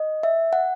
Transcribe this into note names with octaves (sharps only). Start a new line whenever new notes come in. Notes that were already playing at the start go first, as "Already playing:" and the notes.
Already playing: D#5
E5
F#5